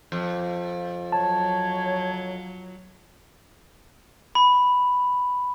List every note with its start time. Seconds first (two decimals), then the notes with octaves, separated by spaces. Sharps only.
0.12 F2
1.12 F#3 C#5 A5
4.35 B5